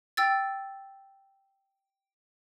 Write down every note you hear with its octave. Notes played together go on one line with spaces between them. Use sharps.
G5 E6 A6